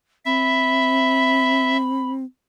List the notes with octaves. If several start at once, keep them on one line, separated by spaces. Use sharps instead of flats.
C4 E5 B5